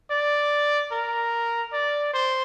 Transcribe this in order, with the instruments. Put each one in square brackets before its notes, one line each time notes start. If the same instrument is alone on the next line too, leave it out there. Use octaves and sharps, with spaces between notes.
[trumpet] D5
A#4
D5
C5